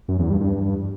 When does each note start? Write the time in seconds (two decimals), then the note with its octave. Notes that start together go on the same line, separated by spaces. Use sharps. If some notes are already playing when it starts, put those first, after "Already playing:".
0.08 F#2
0.19 E2
0.30 G2
0.41 G2